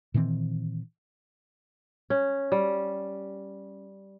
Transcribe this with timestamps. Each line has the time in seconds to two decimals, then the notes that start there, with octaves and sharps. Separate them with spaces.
0.14 A#2 D#3 E3 C4
2.10 C#4
2.52 G3